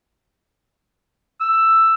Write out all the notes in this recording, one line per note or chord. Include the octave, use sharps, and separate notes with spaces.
E6